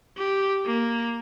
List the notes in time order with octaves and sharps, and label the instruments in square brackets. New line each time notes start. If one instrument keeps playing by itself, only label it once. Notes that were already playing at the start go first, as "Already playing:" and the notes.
[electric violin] G4
A#3